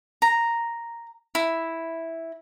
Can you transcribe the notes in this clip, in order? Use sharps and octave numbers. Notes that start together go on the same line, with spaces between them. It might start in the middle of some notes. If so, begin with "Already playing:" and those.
A#5
E4